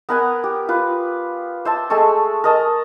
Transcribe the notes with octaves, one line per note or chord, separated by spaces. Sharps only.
B3 A#4 F#5 G#5
G4
F4 B4
C5 E5 A5
G#3 A3 A4 C#6
A#4 D#5 A5